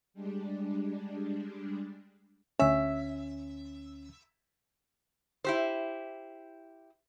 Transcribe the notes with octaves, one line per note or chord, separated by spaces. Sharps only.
G3 G#3 D4
D2 C#4 E5
E4 G4 C5